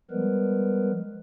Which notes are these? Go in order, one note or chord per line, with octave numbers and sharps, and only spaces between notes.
F3 G3 G#3 B3 A#4 B4